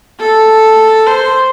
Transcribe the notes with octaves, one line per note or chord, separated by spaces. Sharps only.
A4
C5